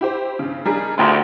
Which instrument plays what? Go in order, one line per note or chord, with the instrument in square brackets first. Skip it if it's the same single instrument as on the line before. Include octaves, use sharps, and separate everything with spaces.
[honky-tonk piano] E4 G4 C5
G2 C#3
[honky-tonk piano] G3 D4 G#4 [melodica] D#4 A#4
[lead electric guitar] D2 [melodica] D#4 F4 G#4 [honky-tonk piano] F#5 G5